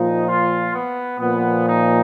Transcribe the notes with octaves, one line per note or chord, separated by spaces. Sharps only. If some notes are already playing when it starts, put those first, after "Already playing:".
Already playing: A#2 F3 D#4
F4
B3
A#2 F3 B3
D#4